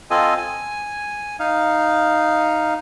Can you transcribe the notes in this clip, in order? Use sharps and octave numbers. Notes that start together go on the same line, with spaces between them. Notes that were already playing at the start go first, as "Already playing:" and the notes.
C4 F4 A4 D#5 G#5
G#5
D#4 F5